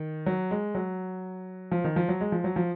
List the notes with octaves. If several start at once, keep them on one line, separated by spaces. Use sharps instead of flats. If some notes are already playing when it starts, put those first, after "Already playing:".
Already playing: D#3
F#3
G#3
F#3
F3
D#3
F3
F#3
G#3
F3
F#3
F3